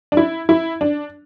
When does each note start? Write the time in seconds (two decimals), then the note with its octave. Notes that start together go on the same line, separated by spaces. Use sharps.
0.12 D4
0.17 E4
0.49 E4
0.81 D4